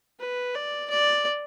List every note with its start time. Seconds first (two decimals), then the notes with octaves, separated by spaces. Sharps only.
0.20 B4
0.55 D5
0.90 D5